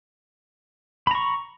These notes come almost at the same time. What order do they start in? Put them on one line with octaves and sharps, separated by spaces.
B5 A#5 C#6